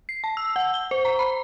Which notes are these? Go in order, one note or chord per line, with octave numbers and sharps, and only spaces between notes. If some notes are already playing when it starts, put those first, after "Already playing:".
C7
A5
E6
F#5
G7
C5
A#5
B5